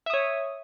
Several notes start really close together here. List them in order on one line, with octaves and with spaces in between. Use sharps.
E5 D#6 C#5